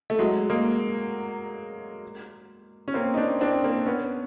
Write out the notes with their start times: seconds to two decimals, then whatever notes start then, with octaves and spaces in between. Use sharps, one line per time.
0.10 A3
0.19 F#3 G#3
0.50 G#3 A#3
2.88 C#4
2.94 A#3 C4
3.14 D#4
3.17 C4 D4
3.41 C4 D4
3.64 A#3 C4
3.86 B3 C#4